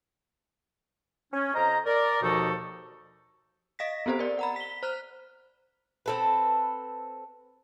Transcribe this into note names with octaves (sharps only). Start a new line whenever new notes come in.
C#4
F2 C5 D#5 A#5
A#4 D5
D#2 B2 F3 D#4 A4 C#6
D#5 F5 A#6 B6
B3 C4 G4 A4 C5
A#4 D5
F#5 A#5 B5
B6 G7
C5 F6 F#6
C4 A4 B4